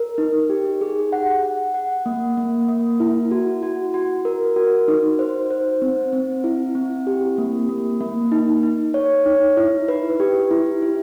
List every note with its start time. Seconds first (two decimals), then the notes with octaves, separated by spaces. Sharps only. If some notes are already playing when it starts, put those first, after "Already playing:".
Already playing: A#4
0.18 D#4
0.50 G4
0.81 G#4
1.12 F#5
1.43 F#5
1.74 F#5
2.06 A#3
2.37 A#3
2.68 A#3
3.00 E4
3.31 F#4
3.63 F#4
3.94 F#4
4.25 A#4
4.56 F#4
4.88 D#4
5.19 C5
5.50 C5
5.82 C4
6.13 C4
6.44 E4
6.75 C4
7.07 G4
7.38 A#3
7.69 A#3
8.01 A#3
8.32 D#4
8.63 D#4
8.94 C#5
9.26 D#4
9.57 E4
9.88 B4
10.20 G4
10.51 E4
10.82 E4